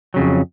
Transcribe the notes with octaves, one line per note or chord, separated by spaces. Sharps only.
F2 C#3 F#3